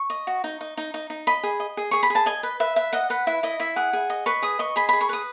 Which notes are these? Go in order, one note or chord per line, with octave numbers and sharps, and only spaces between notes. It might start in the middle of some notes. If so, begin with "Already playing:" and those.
Already playing: C#6
D#5
F#4
D#4
D#4
D#4
D#4
D#4
D#5 B5
G#4
D#5
G#4
G#4 C#6
B5
G#4
A5
D#5 G#5
B4
B4 E5
B4 E5
D#5 F#5
B4 F#5
E4 E5
E4 D#5
E4 E5
G#4 F#5
G#4
D#5
B4 C#6
G#4 D#6
D#5 C#6
G#4 B5
G#4 B5
C#6
B4 D#6